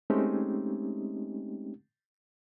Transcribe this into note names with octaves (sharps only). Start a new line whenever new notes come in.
G#3 A3 C4 C#4 D#4 G4